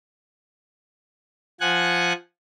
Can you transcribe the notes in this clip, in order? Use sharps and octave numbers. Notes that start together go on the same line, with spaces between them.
F3 F#5 G#5 F#6